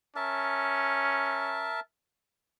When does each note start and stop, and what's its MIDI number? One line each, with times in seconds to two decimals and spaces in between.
0.16 1.73 61
0.16 1.80 70
0.16 1.80 76
0.16 1.80 81